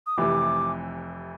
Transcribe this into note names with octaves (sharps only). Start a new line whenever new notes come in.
D#6
F1 F2 C3 E3 D6